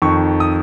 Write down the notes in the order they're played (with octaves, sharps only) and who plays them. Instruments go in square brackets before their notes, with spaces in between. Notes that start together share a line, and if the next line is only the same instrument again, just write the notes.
[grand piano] F2 D#3 C#6
D#6